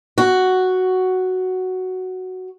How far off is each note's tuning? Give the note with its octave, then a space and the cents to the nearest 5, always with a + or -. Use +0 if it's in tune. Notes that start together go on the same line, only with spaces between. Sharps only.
F#4 +5